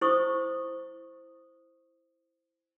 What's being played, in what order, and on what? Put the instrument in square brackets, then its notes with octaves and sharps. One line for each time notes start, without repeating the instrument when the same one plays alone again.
[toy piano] E4 C5 C#6 D#6